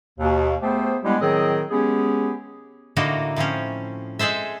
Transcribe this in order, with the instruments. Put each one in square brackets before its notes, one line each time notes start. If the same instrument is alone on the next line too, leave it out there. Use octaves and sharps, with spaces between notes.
[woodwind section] D#2 B2
A3 B3 G4 G#4 C5
G3 G#3 B3 D4 E4 G4
A2 D#3 F#3 C4 G#4 D#5
G#3 B3 C#4 G4 G#4
[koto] A2 D3 A#3 D#4 F#4 A4
A2 F3 C4 C#4
G#3 G#4 A4 C5 E5